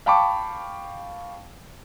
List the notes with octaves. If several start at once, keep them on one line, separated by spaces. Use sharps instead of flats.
F5 G5 A5 B5 C#6 D6